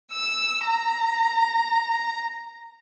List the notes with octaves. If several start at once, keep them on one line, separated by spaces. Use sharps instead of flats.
E6
A#5